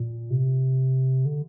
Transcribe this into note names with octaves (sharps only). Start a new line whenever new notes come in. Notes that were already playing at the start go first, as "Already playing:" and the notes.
Already playing: A#2
C3
D3